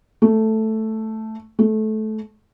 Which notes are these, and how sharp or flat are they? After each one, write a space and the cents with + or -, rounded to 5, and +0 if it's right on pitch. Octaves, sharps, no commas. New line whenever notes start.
A3 +0
A3 -20